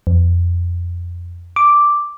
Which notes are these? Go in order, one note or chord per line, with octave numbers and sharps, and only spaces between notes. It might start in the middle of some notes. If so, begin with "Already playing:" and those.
F2
D6